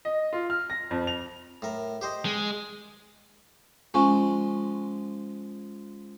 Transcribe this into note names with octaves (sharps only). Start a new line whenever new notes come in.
D#5
F4
F6
A#6
F2
F7
A2 A#4
G4 C5 D#5
G#3
F3 G#3 C#4 G#5 C#6